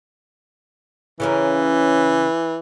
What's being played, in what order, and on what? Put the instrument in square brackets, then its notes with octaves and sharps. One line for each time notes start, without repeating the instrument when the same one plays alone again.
[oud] C#3 C#4 A#4 [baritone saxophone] E3